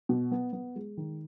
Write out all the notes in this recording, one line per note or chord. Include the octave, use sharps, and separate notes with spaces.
B2
B3
B3
G#3
D#3